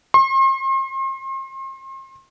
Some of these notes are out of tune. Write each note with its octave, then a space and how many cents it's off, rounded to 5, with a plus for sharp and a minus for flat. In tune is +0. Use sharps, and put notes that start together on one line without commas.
C6 +40